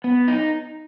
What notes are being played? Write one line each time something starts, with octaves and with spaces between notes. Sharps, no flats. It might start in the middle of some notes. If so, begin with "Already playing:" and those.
B3
D#4